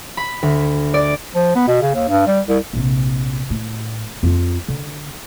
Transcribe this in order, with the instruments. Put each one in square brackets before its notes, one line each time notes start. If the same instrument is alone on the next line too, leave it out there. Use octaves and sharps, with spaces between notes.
[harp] B5
D2
D5
[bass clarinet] F3
B3
B2
C#3
D#2
G2
G3
C2
[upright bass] A#1 C3
A2
F2 F4
D3